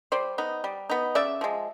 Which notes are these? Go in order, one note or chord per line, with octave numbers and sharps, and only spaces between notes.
G3 C5 D5
B3 D#4
G3
B3 D#4
C#3 D5 E5
F3 G#3